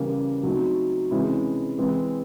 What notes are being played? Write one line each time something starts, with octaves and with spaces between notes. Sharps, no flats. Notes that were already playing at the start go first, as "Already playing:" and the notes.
Already playing: C#3 E3 G3 A#3 C#4
F#3 A3 C4 D#4
C3 E3 G#3 C#4 E4
E3 G#3 C4